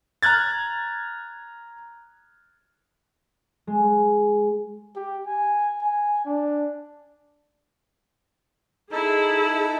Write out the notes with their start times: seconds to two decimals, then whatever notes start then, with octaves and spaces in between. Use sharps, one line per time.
0.23 A#5 F6 F#6 G#6 A6
3.67 G#3
4.96 G4
5.27 G#5
5.81 G#5
6.25 D4
8.92 D#4 E4 G#4 A4